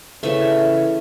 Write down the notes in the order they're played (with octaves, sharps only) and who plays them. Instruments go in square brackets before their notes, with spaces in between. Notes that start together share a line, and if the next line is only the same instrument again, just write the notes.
[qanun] C#3 E3 A3 E5